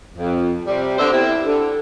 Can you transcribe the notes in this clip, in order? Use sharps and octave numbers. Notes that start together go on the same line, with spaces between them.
F2
C3 G3
D3 B3 C4 C5 D5 E5
G3 C4 E4
D3